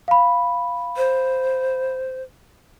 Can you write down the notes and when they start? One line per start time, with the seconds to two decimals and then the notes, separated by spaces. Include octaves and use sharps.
0.08 F5 B5
0.97 C5